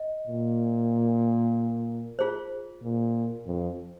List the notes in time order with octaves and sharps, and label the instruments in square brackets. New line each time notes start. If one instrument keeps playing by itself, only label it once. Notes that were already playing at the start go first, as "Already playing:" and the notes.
Already playing: [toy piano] D#5
[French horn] A#2
[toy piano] F4 G#4 C5
[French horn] A#2
F2